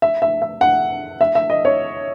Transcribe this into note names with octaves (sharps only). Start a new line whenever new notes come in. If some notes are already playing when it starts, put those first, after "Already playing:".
E5
E5
E5
F#5
E5
E5
D#5
C#5